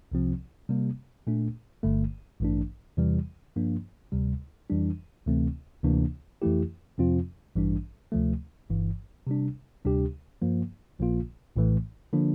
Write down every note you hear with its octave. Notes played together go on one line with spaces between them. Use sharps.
C2 C3 F3 C4
C3 G3 A#3
A#2 A3 D4
G1 G2 D3 A3
A1 G2 E3 A3 D4
E2 C3 E3 G3
G2 F3 A#3 D4
D2 C3 G3
F2 E3 G3 D4
D2 C3 E3 A3 C4
D2 C3 E3 A#3 D4
F2 E3 A3 E4 G4
F2 C3 F3 C4 F4
A1 G2 E3 G3 D4
D2 C3 F3 A3
G1 G2 E3
C3 G3 D4
D2 C3 G3 D4 G4
G2 F3 A#3
A#1 A#2 F3 A#3 F4
A#1 A2 E3 A3
D3 F3 A#3 D4